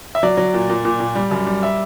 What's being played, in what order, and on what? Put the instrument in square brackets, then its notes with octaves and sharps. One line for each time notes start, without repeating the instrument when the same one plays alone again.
[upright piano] E5
F#3 D5
F#3
A#2
A#2
A#2
A#2
G3
F#2
G3
E5